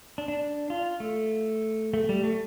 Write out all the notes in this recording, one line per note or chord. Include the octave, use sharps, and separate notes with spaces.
D4
D4
F4
A3
A3
G3
A3